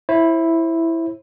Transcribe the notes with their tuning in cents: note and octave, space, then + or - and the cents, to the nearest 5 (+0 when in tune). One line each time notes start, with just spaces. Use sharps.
E4 +0 C5 +40